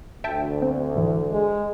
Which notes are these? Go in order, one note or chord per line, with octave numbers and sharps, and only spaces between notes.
D2 E5 G5 A5
C4
G#2 E3
G#3